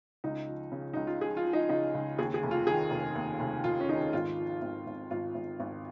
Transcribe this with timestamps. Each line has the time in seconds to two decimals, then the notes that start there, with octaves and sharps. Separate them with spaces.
0.24 C#2 D#4
0.48 F3
0.72 C#3
0.94 C#2 D#4
1.07 F4
1.21 F3 G#4
1.37 F4
1.46 F3
1.53 D#4
1.69 C#3 D#4
1.94 C#2
2.18 D#2 G#4
2.34 G#4
2.43 F1
2.51 F4
2.67 D#3 G#4
2.91 F1
3.15 D#2
3.40 F1
3.64 F1 F4
3.80 C#4
3.89 D#3 D#4
4.13 G#1 F4
4.38 F3
4.62 G#1
4.87 G#1
5.11 G#1 F4
5.35 G#1
5.60 G#1